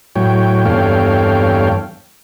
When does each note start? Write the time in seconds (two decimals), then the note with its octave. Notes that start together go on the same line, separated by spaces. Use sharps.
0.16 A2 F#3 C#5 G5
0.65 E2 G2 A4 C#5 F5 G5